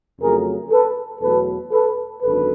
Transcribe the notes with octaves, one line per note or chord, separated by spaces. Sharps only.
F2 C#3 F#3 A3 G#4 A#4
A4 B4
E2 B2 F#3 A3 A4 B4
A4 B4
G#1 F#2 D3 A4 B4